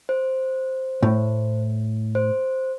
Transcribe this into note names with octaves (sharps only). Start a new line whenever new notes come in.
C5
A2
C5